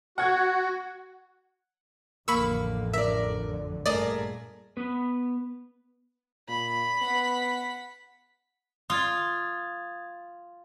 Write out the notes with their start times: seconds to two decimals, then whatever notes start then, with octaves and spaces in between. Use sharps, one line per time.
0.18 F#4 F#5 G#6
2.28 A1 F2 D3 A#3 B5 C#6 E6
2.93 A#4 D5 E5
3.86 G2 A#2 A3 G#4 A#4 D5 D#5
4.77 B3 B4
6.48 A#2 B5
7.02 B3 F#5 B6
8.90 F4 D#6 G#6 A6